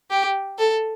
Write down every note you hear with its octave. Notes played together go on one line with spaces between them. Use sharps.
G4
A4